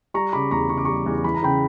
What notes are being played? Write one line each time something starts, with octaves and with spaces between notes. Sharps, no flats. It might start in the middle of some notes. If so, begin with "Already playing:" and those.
G3 A#5 C#6
C#3 B5 D6
E2 A#5 C#6
C#3 C#6
D6
G3 A#5 C#6
E2
E3 B5
A#5
C#3 G5 B5